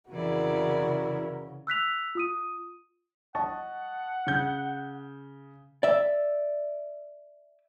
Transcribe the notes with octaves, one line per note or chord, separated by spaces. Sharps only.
F2 C#3 E3 E4 F#4 G#4 A#4 D5
E6 F#6 B6 F7
F4 D#6 D#7
D#5 F#5 A5 C#6
C#3 G6
D5 E5